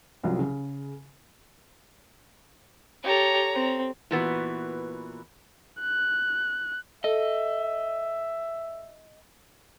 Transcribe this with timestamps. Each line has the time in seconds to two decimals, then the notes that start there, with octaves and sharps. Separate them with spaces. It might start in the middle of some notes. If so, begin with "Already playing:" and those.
0.23 C2 F3 F#3
0.39 C#3
3.03 G4 A4 C#5 A#5
3.54 C4
4.11 A#2 E3 B3 F#4
5.81 F#6
7.04 A4 D#5 E5